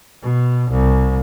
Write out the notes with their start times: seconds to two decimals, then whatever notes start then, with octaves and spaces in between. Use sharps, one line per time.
0.22 B2
0.71 C2